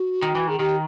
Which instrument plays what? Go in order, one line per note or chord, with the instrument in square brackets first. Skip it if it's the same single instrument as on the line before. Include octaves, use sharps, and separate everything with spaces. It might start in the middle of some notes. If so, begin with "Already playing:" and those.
Already playing: [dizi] F#4
[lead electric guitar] D#3
E3
[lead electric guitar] D#3 [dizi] G#4
[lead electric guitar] D#3 [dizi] G4